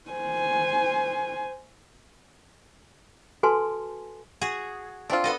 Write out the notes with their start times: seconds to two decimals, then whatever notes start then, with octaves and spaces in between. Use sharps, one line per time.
0.10 C5 G#5
3.43 F#4 A4 B4 G#5 A5 C6
4.41 F#4 G#4
5.10 A3 C4 D4 F4
5.24 B3 A4 D#5